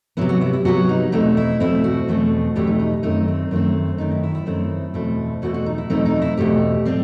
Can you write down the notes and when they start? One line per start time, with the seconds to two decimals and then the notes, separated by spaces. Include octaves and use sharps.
0.17 C3 F#3 B3 E4
0.29 F#4
0.41 E4
0.53 E4
0.65 C3 F#3 B3 F#4
0.89 D#4
1.12 E2 B2 A3 C4 D#4
1.37 E4
1.60 E2 B2 A3 C4 E4
1.84 F#4
2.08 E2 B2 A3 C4
2.56 E2 B2 A3 C4 G4
2.67 D#4
2.79 D#4
3.03 F#2 D#3 A3 C4 D#4
3.28 C4
3.51 F#2 D#3 A3 C4
3.98 F#2 D#3 A3 C4 D#4
4.11 E4
4.23 E4
4.35 E4
4.46 F#2 D#3 A3 C4
4.94 E2 B2 A3 C4
5.42 E2 B2 A3 C4 F#4
5.54 F#4
5.66 D#4
5.78 E4
5.90 E2 B2 A3 C4 D#4
6.05 D#4
6.22 E4
6.37 E2 B2 A3 C4 G4
6.85 A2 G3 C4